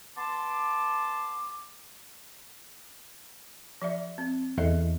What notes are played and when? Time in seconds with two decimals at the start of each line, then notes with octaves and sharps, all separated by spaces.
0.17 B3 A5 C6 D6
3.82 F3 D5 E5
4.18 C4
4.58 E2 A4 D#5 E5